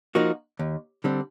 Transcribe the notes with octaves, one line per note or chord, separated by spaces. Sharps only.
F3 A#3 D#4 F#4
D#2
D3 G3 C4